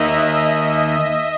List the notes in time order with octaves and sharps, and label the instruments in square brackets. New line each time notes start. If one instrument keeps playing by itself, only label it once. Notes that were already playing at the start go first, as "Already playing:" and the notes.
Already playing: [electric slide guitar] D#3 A#3 D#4 [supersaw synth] D#5 E5
[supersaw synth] E5